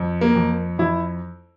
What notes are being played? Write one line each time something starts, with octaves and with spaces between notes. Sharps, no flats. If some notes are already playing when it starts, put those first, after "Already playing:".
Already playing: F2
A#3
F2
F2 E4